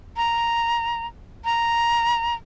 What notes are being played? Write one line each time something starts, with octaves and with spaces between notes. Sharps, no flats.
A#5
A#5